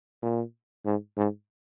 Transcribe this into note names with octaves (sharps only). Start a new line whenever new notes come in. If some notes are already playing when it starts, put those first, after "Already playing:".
A#2
G#2
G#2